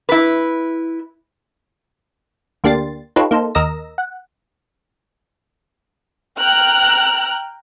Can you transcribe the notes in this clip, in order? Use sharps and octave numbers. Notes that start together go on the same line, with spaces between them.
E4 B4
D2 A#3 D4 G4 C6 A6
D#4 F4 G4 A4 B4 C#5
A#3 D#4 A4 C5
D#2 A#4 D#5 E6 A#6
F#5
G5 A#5 F6 F#6